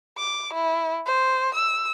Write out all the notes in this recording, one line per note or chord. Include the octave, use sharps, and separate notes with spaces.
D6
E4
C5
E6